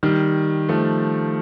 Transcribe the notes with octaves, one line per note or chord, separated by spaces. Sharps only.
D#3 G3
F3 A3